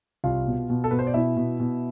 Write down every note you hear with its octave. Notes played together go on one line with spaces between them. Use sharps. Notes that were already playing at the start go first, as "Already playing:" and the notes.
C2 F4 F5
B2
B2
A4
B2 B4
C5
D5
B2 E4 E5
B2
B2